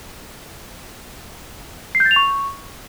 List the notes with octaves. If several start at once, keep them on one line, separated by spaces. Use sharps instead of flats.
C7
G6
A6
F7
C#6